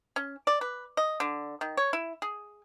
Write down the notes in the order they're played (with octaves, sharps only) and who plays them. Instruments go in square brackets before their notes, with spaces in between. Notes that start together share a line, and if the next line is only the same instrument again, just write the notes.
[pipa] C#4
D5
B4
D#5
D3
D#3
C#5
E4
G#4